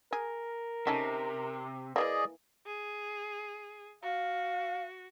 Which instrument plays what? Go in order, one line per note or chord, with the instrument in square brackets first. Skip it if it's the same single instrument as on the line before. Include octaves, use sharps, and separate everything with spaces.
[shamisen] G#4 [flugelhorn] A#4
[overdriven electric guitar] C3 [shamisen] C#4 D#4 A4
[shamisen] E3 G3 A#3 [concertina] G#4 D5 D#5
[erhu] G#4
[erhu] F#4 [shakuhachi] F5